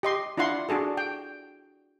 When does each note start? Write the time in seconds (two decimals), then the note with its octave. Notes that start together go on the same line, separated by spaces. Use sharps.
0.03 G4 D#5 C6
0.37 D4 E4 F4 F#5 C6
0.69 D4 F#4 G#4 A4
0.97 G5